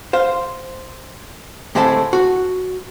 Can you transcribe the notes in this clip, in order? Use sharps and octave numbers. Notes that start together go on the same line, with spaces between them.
C5 F5
D2 A2 G#3 C4 E5 A5
F#4